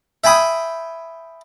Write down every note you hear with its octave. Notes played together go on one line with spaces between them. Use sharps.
E5 G5 G#5 B5 D#6